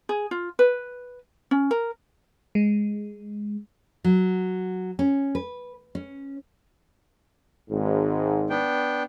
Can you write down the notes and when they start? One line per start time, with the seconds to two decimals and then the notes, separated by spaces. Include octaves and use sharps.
0.09 G#4
0.31 F4
0.59 B4
1.51 C#4
1.71 A#4
2.55 G#3
4.04 F#3
4.99 C#4
5.35 B4
5.95 C#4
7.70 G#1 G#2
8.50 B3 D4 G5